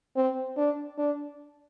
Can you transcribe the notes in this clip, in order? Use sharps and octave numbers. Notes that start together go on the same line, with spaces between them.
C4
D4
D4